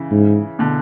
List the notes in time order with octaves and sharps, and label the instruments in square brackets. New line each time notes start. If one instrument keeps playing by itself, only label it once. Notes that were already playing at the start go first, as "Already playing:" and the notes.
Already playing: [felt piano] C#3 E3
[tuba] G#2
[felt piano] B2 D3